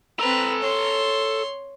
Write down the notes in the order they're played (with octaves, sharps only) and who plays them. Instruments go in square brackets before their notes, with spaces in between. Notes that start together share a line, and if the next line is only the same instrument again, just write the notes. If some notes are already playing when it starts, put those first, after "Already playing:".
[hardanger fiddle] C4 B4 [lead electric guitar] A4 A#5
[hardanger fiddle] C#5 C6